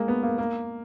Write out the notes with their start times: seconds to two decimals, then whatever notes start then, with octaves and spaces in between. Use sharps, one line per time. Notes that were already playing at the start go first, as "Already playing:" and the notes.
Already playing: G#3 A#3
0.08 B3
0.23 A#3
0.38 A#3